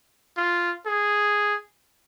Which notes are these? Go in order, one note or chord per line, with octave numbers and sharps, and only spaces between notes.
F4
G#4